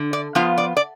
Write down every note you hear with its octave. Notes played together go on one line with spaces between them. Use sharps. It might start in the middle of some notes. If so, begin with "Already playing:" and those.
Already playing: D3
D5
F3 B3 F4 F5
D5
D5